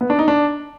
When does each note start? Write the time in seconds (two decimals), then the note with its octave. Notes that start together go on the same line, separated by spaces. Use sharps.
0.01 B3
0.10 D4
0.19 D#4
0.28 D4